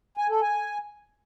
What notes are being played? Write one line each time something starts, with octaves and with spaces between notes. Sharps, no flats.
G#5
A4
G#5